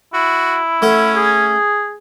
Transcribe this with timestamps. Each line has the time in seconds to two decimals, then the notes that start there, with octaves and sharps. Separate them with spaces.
0.14 E4 F#4
0.82 A3 C#4 A4 F#5
1.16 G#4